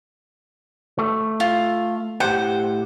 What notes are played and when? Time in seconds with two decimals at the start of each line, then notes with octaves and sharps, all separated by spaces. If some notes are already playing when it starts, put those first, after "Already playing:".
0.99 A3
1.40 F4
2.20 A2 G4 C5 F#5